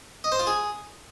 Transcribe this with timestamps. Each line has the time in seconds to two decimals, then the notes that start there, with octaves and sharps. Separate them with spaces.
0.24 D#5
0.32 C5
0.39 F4
0.47 G#4